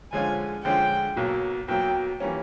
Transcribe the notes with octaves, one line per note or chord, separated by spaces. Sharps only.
D3 F3 G#3 C#4 F4 G#5
D3 F3 G#3 C#4 F4 G5
B1 B2 F#3 A#3
B1 B2 F#3 A#3 G5
E3 G3 A#3 C#4